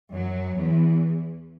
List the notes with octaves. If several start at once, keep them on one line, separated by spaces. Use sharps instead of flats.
F#2 F#3
E2 E3